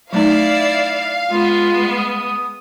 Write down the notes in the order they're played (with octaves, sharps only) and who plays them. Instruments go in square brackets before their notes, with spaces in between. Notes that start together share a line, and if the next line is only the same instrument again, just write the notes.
[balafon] F#3 A3 D#4 [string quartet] E4 D5 [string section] F5
[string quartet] G#3 B3 [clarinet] F4
[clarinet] D#6